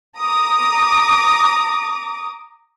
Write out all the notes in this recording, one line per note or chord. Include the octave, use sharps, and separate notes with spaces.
A#5 D6 D#6